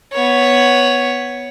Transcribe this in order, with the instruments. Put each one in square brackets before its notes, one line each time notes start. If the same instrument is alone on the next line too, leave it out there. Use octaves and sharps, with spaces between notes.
[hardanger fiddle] B3 C#5